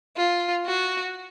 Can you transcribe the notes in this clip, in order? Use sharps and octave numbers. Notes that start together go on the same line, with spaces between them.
F4
F#4